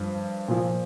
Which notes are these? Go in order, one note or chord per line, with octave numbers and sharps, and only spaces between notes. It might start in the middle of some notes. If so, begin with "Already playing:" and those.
Already playing: G2 F3
A#2 F3